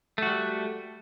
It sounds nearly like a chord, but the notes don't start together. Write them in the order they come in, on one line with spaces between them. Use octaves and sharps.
A3 F#4 G3